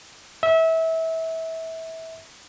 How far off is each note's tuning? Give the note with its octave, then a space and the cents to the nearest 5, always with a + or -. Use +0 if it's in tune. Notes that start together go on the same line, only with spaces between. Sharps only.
E5 -25